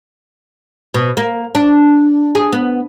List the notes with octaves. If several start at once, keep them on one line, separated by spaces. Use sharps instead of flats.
B2
A#3
D4
G#4
B3